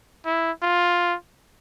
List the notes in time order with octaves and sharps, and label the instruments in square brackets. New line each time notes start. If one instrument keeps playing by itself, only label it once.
[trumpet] E4
F4